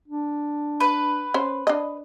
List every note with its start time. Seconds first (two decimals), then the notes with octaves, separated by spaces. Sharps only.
0.08 D4
0.80 B4
1.34 C#4 C5
1.67 D4 D#5